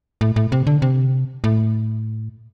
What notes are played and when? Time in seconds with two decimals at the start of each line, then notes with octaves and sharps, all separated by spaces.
0.21 A2
0.36 A2
0.52 C3
0.67 D3
0.82 C3
1.44 A2